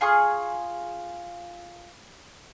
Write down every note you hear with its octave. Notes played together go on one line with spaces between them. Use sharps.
F4 G#4 C#6 D#6